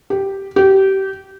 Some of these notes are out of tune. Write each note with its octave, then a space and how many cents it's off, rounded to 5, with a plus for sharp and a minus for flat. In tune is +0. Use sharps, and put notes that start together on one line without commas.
G4 -5
G4 -25